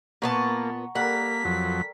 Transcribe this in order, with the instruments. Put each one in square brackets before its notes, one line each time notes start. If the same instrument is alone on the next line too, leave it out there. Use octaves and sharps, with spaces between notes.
[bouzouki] A#2 B3 A5 [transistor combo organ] A#3 [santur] F#5 A#5 C#6
[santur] G3 A4 A#4 [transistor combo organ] A#3 [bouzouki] F#5 [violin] B6
[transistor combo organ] F2 F#3